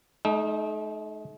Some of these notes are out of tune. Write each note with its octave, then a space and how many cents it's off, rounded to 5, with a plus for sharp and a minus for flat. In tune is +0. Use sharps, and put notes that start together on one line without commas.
A3 -45 D#4 +0